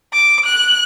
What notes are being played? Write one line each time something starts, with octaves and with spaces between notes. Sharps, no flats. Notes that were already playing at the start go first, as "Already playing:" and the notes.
D6
F#6